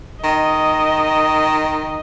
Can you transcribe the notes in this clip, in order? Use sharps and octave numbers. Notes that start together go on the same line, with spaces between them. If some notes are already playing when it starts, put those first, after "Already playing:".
D#3 D#5